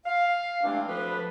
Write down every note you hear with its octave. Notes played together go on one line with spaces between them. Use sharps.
F5
G2 E3 G#3 A3 C4 D4
D2 F3 B4